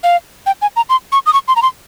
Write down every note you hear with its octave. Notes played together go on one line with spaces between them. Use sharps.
F5
G5
G#5
A#5
C6
C#6
D#6
C#6
C6
A#5
C6